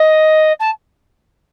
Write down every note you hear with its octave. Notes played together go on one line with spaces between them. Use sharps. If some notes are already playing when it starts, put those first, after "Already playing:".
Already playing: D#5
A5